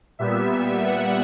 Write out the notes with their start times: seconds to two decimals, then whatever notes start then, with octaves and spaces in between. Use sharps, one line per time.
0.19 A#2 G3 B3 E5
0.85 F#5